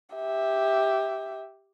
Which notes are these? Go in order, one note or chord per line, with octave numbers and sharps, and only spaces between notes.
G4 E5